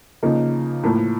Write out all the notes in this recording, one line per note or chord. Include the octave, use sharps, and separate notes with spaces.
C#3 F3 A#3 D#4
A2 F3 A#3